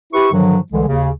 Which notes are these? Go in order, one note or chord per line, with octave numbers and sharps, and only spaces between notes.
E4 G4 B4 C#6
G2 D3 D#3 F3 F#3
C2 D3 E3 G#3
D#2 C#3